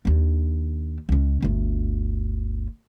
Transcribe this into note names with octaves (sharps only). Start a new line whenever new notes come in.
D#2 D4
C#2 C#4
G1 D2